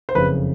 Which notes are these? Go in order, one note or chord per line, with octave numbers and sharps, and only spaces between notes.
C5
F#1 F2 C#3 B4